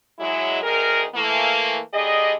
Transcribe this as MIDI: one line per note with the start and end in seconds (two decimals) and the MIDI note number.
0.19 0.59 54
0.19 0.59 56
0.19 0.59 64
0.63 1.04 38
0.63 1.04 51
0.63 1.04 68
0.63 1.04 70
1.15 1.79 52
1.15 1.79 57
1.15 1.79 58
1.93 2.32 50
1.93 2.32 55
1.93 2.32 68
1.93 2.32 75